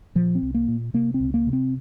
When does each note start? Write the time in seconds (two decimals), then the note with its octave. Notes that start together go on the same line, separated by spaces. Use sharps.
0.15 A#2 F3
0.35 C4
0.42 C2
0.54 A#3
0.68 A#2
0.94 C3 A#3
1.14 C4
1.20 C#2
1.34 A#3
1.47 C3
1.53 C4